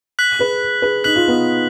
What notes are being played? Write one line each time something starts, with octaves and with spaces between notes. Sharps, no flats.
F#6 B6 F#7
G#4 B4
G#4 B4
D#4 F#6 B6 F#7
F4
B3 D#4